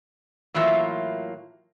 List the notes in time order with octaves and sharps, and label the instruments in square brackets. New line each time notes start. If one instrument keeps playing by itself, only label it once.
[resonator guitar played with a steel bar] A2 E3 F#3 A#3 F4 E5